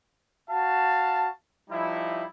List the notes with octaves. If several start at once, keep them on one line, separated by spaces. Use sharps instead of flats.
F#4 F5 A5
F3 G3 D#4 E4